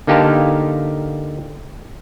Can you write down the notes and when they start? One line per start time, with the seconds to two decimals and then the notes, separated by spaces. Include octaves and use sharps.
0.07 D3 A#3 D#4 G4 F5 A5